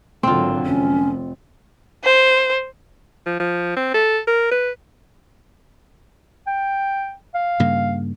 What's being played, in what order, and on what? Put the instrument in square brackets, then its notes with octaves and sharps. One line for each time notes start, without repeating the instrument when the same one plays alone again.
[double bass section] G#1 D3 F#3 [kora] C4 F4
[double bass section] F1 [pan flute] C#4
[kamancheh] C5
[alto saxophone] F3
F3
C4
A4
A#4
B4
[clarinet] G5
F5
[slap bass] G2 C#3 A#3